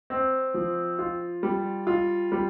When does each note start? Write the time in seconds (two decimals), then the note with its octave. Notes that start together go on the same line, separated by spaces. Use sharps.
0.10 C4
0.54 F3
0.99 F4
1.43 G3
1.87 F4
2.32 G3